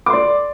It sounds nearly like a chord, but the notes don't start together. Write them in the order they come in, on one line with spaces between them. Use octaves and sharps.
D6 C6 D5